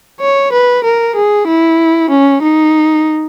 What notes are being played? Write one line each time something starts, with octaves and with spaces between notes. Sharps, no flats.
C#5
B4
A#4
G#4
E4
C#4
D#4